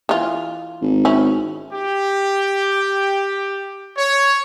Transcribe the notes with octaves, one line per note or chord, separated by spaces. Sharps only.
E3 F4
G#1
C#4 E4
G4
C#5